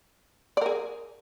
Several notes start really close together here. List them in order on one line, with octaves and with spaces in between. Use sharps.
D5 A#4 G#4